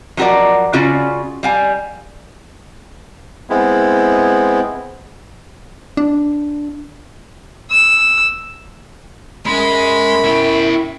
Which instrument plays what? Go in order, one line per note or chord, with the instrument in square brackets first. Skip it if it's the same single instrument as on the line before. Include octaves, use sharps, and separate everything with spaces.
[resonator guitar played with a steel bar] F3 F#3 F#4 A#4 D5
C#3 C#4 F4 F#4 D5
G3 F5 G#5
[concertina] G#3 B3 C4 E4
[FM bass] D4
[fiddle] E6
[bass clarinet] F#2 [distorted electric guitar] G#3 [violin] B5
[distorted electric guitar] E4 G5